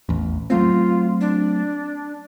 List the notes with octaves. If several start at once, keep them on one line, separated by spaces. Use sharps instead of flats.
A1 E2
F#3 A3 C4 F4
D4